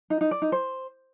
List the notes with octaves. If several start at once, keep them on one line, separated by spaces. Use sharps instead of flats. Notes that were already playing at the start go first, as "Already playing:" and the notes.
D#4
D#4
D5
D#4
C5